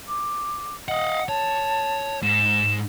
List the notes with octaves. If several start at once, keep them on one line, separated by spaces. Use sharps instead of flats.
D6
D#5 F5 F#5
C#5 A5
G#2 E7